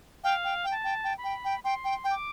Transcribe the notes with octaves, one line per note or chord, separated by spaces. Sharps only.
F5 G5
G5
G5
A5
G5
G5
B5
G5
G5
G5 C6
G5
G5
D6